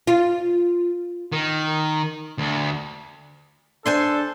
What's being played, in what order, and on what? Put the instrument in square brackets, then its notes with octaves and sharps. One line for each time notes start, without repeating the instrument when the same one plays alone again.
[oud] F4
[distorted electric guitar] D#3
D2
[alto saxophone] D4 [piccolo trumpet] A4 [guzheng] C5 G#5 C6